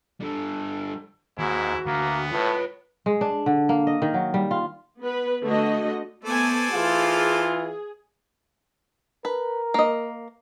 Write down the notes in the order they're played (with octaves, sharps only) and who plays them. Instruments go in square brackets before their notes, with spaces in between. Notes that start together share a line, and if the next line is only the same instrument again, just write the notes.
[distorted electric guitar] D3 G3 [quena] A4
[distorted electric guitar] D#2 [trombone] G#2 [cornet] E4 [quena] F#4
[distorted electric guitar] D2 [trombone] A#3 [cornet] B3
[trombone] A2 [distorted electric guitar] F4 C#5 [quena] B4
[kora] G#3
D4
D3
A#3
D#5
D#3
F#3
G3
F4
[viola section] B3 B4
D3 A3 F#4 D#5
[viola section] A3 B3 G#5 [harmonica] A4 C5 D5
[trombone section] E3 F4 [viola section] G#4
[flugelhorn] A#4 [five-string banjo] B4
[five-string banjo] A#3 D#5